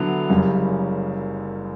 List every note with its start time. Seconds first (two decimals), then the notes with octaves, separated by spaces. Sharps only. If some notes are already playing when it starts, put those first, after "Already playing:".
Already playing: D3 F#3 B3 E4
0.30 F#1 F#2 C#3 G3 C#4